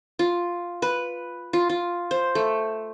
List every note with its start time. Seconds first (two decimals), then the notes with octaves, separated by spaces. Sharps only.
0.19 F4
0.82 B4
1.53 F4
1.69 F4
2.11 C5
2.35 A3